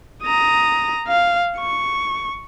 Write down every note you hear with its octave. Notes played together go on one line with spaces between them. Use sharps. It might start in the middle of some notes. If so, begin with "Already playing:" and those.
A#5 D#6
F5
C#6